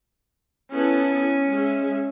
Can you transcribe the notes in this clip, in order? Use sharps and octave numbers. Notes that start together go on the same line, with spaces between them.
B3 C#4 E4 A4
G#3 E5